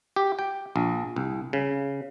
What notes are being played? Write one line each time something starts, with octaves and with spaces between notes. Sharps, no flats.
G4
G5
A#1
C2
C#3